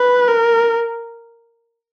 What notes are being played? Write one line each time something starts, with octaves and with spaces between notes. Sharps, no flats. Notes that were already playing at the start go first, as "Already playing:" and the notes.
Already playing: B4
A#4